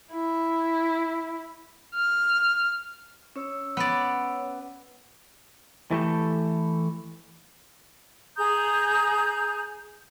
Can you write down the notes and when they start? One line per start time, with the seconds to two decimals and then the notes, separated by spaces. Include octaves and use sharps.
0.13 E4
1.95 F6
3.36 C#4 C#5 E6
3.77 B3 D5
5.91 E3 A3 G4 A4
8.37 G#4 A#5 D#6 G6